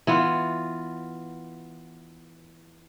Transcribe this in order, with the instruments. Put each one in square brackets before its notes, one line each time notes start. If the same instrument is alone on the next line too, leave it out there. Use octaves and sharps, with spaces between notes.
[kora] E3 B3 F4